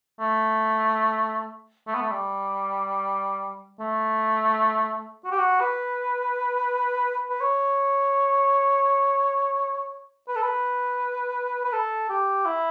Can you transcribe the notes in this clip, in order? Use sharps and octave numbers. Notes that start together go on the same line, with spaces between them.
A3
A3
B3
A3
G3
A3
F#4
G4
F#4
B4
B4
C#5
B4
A4
B4
B4
A4
G4
E4